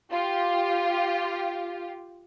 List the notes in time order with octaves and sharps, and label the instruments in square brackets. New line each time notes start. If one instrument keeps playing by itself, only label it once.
[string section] F4 G4